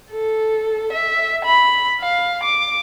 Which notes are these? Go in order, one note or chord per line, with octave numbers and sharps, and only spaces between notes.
A4
E5
B5
F5
D6